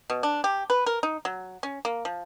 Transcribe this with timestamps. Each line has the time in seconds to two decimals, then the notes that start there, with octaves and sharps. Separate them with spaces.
0.10 B2
0.23 D4
0.44 G4
0.70 B4
0.86 A#4
1.03 D#4
1.25 F#3
1.63 C#4
1.85 A#3
2.05 F3